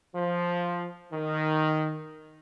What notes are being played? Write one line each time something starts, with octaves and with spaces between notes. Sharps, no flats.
F3
D#3